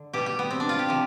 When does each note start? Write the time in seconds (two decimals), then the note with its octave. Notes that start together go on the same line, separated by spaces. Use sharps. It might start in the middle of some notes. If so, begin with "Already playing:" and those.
Already playing: D3
0.13 B2 G3 G4
0.26 G4
0.39 B3
0.51 C4
0.60 D4
0.69 F4
0.79 G4
0.88 C3 F3